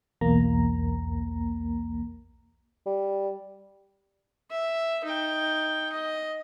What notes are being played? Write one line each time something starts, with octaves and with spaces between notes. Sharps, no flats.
B1 E2 A#3 A#5
G3
E5
D#4 G5
D#5